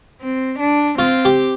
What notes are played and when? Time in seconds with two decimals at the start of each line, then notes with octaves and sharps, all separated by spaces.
0.21 C4
0.60 D4
0.98 C4 F4
1.25 G4